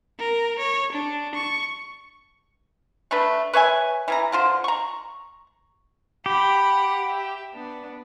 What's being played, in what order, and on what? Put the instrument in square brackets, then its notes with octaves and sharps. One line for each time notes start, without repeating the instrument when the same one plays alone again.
[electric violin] A#4
C#5
D4
C#6
[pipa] A3 D4 B4
B4 C#5 E5 G#5
E3 C#4 A#5
D3 F4 C5
A#5 C#6
[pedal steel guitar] G4 [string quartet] F#5 B5
[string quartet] E5
B3 D4